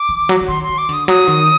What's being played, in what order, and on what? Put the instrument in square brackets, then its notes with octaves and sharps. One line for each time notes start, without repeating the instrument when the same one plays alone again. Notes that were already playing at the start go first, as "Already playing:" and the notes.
Already playing: [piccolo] D6
[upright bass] D#3
F#3
F#3
[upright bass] D#3 [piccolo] C6
[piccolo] C6
[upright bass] D#3
[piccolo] D6
[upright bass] D3 [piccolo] D#6
[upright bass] F#3 [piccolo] D#6
[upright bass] D#3